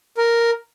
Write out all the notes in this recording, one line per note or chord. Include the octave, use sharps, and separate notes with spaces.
A#4